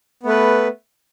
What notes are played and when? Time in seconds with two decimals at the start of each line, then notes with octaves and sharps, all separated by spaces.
0.23 B3
0.26 A3
0.29 B4